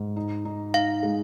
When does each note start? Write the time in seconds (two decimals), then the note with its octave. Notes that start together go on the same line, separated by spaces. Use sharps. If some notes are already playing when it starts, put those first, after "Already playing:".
Already playing: G#2
0.16 D#4
0.45 D#4
0.74 D#4 F5
1.03 G#3